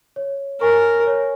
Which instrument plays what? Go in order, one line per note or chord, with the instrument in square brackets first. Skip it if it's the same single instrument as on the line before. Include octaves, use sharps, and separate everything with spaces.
[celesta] C#5
[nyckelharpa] A#4 [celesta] G#5 C#6
[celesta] C#5